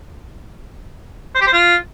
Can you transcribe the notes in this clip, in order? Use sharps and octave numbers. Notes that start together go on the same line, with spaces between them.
C5
G4
C5
F4